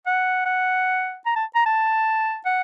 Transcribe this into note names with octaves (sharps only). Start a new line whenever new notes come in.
F#5
F#5
A#5
A5
A#5
A5
F#5